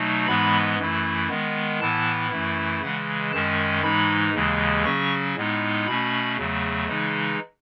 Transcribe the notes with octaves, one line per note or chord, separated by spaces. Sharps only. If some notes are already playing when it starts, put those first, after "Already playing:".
Already playing: B2 F#3 A3 D#4
G#2 E3 G#3 B3 B5
F#2 E3 A3 E4
D#3 G#3 B3
A2 E3 B3 E4 A5
F#2 E3 A3 E4
C#3 E3 G#3 F#5
F#2 D#3 G#3 C#4 A5
G#2 E3 G#3 D#4 B5
D#2 C#3 E3 G#3
C#3 F#3 C#4 C#6
A2 G#3 B3 D#4
B2 A3 C#4 B5
E2 C#3 F#3 A3
C#3 E3 G#3 D#4